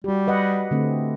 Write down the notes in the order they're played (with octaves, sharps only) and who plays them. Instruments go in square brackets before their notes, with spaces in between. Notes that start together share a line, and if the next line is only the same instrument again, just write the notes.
[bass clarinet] G3 [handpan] F#4 G4
[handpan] B4 D#5 F#5
D3 A3 C4